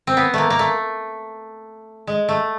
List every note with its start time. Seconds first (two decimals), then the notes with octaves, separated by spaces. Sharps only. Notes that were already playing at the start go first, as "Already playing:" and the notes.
0.07 C4
0.17 B3
0.34 A3 A#3
0.50 A#3
0.59 A3
2.07 G#3
2.29 A3